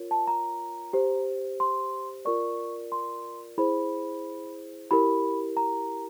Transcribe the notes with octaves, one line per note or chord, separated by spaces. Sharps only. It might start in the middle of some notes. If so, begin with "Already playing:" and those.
Already playing: F4 A#4 C#5
A5
A#5
G4 C5
C6
F4 A#4 D5 C#6
C6
E4 G#4 C5 B5
E4 G4 A#4 B5
A#5